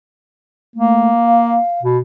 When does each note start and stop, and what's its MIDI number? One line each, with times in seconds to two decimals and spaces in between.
0.76 1.09 57
0.76 1.58 58
1.26 1.81 77
1.83 1.98 47